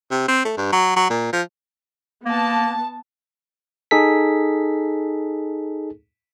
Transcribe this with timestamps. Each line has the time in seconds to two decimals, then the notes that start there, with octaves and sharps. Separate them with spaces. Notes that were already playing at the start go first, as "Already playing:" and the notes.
0.11 C3
0.28 C4
0.45 A3
0.57 G2
0.72 F#3
0.97 F#3
1.10 A#2
1.33 F3
2.26 A#3 B3 A5
3.91 D#4 G#4 A4 B6